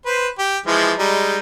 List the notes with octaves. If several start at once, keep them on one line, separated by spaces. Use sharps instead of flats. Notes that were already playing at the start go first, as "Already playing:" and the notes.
B4 C5
G4
E3 F3 G#3
G3 G#3 D#4